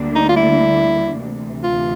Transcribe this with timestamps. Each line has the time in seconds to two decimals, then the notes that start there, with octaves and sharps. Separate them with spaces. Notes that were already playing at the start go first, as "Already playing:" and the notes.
Already playing: D2 D3 G3 A#3 D4
0.15 D#4
0.29 F4
0.36 E4
1.21 D2 C3 E3
1.63 F4